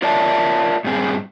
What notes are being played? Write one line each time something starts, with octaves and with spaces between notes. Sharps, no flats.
F4 A#4 C#5 D5 E5 A5
G2 A#2 C4 G#4